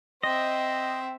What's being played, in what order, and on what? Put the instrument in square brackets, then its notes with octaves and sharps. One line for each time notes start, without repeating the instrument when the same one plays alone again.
[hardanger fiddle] C4 E5 [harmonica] C5 [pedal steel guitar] D#5 [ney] G5